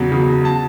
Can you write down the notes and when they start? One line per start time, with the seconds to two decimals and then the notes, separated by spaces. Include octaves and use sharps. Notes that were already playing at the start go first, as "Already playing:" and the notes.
Already playing: E2 C#3 F#3
0.12 C#3 F#3
0.45 A5